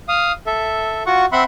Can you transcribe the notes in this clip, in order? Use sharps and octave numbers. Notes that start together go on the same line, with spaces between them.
F5 D#6
A4 E5
F4 F#4 F#5 C#6
C4 E5 F#5 B5 C6